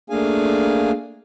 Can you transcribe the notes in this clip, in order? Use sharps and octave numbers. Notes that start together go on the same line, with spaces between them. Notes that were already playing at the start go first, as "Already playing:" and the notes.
A3 A#3 D4 G#4 F5 G#5